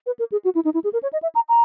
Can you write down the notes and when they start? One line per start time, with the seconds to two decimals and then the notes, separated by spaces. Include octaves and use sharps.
0.06 B4
0.19 A#4
0.32 G#4
0.45 F#4
0.55 E4
0.65 D#4
0.74 E4
0.84 G#4
0.93 A#4
1.03 C#5
1.13 D#5
1.22 E5
1.35 A#5
1.49 A#5